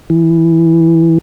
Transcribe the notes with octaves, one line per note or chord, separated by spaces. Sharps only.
E3